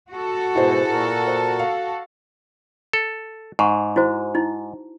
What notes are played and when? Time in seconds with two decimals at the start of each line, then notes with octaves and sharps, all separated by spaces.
0.10 F#4 A4
0.55 G#2 B2 E4 G#4 C5
0.90 A#2 A#4
1.27 C5
1.59 F5
2.93 A4
3.59 G#2 F#5 C#6
3.96 E4 F#4 C5
4.35 D#4 E4